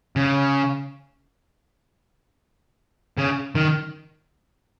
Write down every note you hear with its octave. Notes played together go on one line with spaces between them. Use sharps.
C#3
C#3
D#3